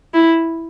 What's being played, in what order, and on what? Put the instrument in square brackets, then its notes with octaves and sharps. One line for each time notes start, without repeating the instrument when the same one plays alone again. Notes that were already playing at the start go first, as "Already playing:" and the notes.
[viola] E4